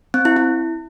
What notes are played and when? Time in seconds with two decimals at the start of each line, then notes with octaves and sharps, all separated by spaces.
0.14 C4
0.25 E4
0.36 E4